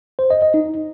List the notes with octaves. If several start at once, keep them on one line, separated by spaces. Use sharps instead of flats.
C5
D#5
D#5
D#4